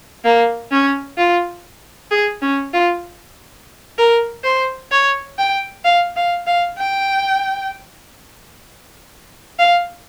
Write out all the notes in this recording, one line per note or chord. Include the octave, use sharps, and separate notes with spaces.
A#3
C#4
F4
G#4
C#4
F4
A#4
C5
C#5
G5
F5
F5
F5
G5
F5